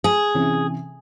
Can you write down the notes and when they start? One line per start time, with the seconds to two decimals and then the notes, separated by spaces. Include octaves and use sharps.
0.04 G#4
0.34 C3 E3 C#4